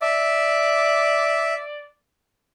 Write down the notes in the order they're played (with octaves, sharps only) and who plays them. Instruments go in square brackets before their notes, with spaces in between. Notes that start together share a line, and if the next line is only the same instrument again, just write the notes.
[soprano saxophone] D5 [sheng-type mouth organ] E5